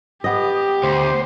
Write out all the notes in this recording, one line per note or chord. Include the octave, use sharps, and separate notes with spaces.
B3 G4 D#5
D2 C5